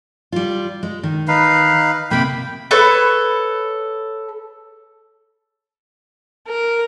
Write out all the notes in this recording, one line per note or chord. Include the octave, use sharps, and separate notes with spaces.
G3 F4
G#3
D#3
D#4 B4 F5
C3 A#3 G5 B5
A4 B4 C#5
A#4